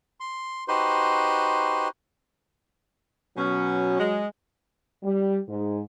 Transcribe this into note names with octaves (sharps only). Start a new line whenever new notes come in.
C6
D#4 F#4 G4 B4 C5 C6
B2 F#3 B3 C#4
G#3
G3
G#2